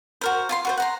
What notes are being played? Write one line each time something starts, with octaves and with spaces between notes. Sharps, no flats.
F#4 A#4 C5
F4 G#5 C6
F#4 B4 C5
F#5 A#5 C6